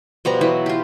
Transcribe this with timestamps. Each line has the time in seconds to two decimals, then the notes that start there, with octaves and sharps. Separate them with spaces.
0.25 B2 F3 G3 A#5
0.41 E3 F#3 E4
0.66 F4 G4